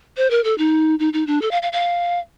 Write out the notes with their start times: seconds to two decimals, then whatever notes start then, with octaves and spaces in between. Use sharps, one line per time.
0.17 C5
0.31 A#4
0.44 A4
0.58 D#4
0.99 D#4
1.13 D#4
1.27 D4
1.42 A4
1.51 F5
1.62 F5
1.73 F5